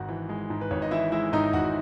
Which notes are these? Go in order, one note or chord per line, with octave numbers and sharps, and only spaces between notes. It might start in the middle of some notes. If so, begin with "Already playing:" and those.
Already playing: G#1 G#2 F#4 F#5
E3
G#3
G#2
B4
G#1 C#5
D#5
E3 E4 E5
G#3 E4 E5
G#2 D#4 D#5
G#1 F#4 F#5